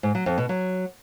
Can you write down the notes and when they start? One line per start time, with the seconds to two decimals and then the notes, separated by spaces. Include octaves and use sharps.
0.03 G#2
0.15 F#3
0.26 F2
0.38 B2
0.49 F#3